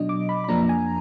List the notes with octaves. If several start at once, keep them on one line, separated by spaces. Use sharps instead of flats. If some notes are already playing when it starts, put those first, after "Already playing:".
Already playing: B2 F#3 D4 D#5
D6
B5
B5
F2 F3 A#3 D4 A#5
G#5